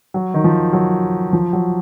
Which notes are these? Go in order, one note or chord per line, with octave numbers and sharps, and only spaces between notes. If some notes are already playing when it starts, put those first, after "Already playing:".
F#3
D#3
F3
F#3
F3
F#3